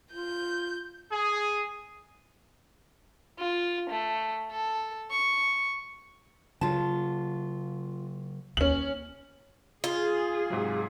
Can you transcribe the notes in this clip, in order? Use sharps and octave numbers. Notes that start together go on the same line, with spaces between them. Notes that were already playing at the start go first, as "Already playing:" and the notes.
F4 G6
G#4
F4
A3
A4
C#6
C#3 F#3 F4 A5
D#2 C#4 F#7
F4 G#4
G#2 C3 F#3